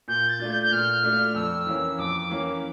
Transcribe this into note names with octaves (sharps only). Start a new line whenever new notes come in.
A#2 G6
A6
A3 D4 F4
G6
G6
A#2 F6
A3 D4 F4
F2 E6
E3 A#3 C#4
F2 D6
E3 A#3 C#4